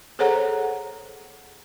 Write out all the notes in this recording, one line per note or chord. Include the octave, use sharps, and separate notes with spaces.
G#4 A4 C5 C#5 F#5 A#5